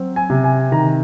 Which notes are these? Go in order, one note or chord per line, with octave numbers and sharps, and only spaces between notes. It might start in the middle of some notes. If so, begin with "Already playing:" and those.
Already playing: F#3 C4
G#5
C3
G#5
D#3 A#5